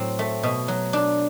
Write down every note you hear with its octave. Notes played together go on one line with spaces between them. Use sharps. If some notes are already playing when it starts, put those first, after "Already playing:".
Already playing: A2 F#3 C4
A3
B2
F#3
D4